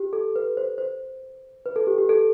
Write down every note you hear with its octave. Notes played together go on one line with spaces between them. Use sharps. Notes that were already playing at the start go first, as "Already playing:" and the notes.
Already playing: G4
A4
B4
C5
C5
B4
A4
G4
G4
A4